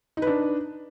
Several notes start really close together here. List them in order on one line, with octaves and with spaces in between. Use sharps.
D#4 B4 D4